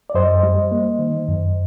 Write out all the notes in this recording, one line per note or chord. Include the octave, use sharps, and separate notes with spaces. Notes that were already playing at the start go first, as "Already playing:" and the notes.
D5
F#2 C5 D#5
G3
A#3
D#3
F#2